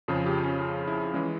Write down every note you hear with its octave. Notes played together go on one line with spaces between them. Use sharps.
F2 C#3 F3 G#4
G4
C#4
F4
E4
E3 G#3 C#4